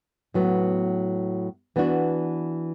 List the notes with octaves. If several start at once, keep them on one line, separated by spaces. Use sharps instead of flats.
A2 F#3 B3
E3 B3 D4 F#4